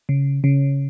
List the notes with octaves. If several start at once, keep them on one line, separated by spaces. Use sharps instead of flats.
C#3
C#3